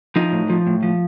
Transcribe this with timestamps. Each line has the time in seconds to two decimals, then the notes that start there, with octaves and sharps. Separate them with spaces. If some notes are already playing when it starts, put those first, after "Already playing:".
0.16 F3 D#4
0.32 A2
0.50 F3
0.67 A2
0.83 F3